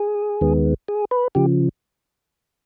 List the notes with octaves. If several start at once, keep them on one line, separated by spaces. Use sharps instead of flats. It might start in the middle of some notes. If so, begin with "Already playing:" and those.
Already playing: G#4
D#2 D#3 G#3 B3
G#4
B4
C#3 F3 G4